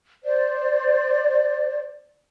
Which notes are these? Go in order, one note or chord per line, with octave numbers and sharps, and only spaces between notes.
C5 D5